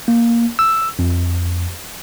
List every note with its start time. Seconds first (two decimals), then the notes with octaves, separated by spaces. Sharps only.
0.08 A#3
0.59 E6
0.99 F2